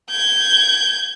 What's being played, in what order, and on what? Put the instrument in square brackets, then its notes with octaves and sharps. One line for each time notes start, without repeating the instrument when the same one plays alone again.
[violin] G6 G#6